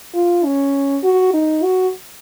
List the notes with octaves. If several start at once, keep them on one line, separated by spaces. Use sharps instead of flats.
F4
C#4
F#4
D#4
F#4